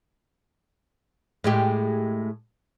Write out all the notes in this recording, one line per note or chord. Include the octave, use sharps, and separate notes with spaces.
A2 G#3 G4